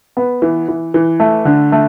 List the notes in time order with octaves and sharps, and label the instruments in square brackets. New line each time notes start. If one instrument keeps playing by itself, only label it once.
[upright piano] B3
E3
E3
E3
A3
D3
A3